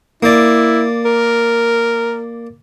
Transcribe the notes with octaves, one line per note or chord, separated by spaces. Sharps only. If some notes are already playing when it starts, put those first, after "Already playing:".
A#3 E4 D5
A#4